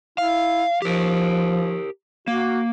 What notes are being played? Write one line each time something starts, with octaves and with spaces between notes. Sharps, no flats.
E4 F5
F3 G4 A#4
A#3 F#4